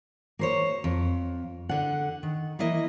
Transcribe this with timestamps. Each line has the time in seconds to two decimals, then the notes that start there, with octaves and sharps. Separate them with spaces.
0.39 A#3 C5 C#5
0.84 F2
1.69 D3 F#5
2.23 D#3
2.59 E3 A#3 E4 D#5